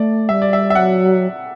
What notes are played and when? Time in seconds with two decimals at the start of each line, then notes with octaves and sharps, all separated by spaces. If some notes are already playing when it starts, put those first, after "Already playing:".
Already playing: A3 D5
0.29 G3 E5
0.42 D5
0.53 E5
0.70 E5
0.75 F#3 F#5